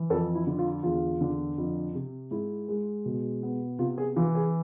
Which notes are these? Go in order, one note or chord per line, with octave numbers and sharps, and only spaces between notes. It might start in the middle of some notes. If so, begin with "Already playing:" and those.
Already playing: E3
F2 A4
E4
D3
F4
E2 F4
D3
F2
C3
G#2 E4
G#3
B2
B3
C3 F4
G#4
E3 F4
G#4